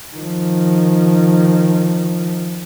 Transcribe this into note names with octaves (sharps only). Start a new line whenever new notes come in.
D#3 F3